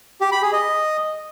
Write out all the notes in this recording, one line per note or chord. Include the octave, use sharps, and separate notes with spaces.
G4
B5
G#4
D#5